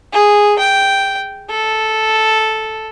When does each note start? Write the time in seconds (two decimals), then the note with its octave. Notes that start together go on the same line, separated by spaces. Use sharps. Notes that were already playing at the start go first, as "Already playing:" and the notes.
0.13 G#4
0.59 G5
1.49 A4